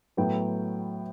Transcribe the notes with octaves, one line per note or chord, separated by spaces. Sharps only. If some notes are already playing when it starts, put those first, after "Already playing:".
A2 F#3 B3 G5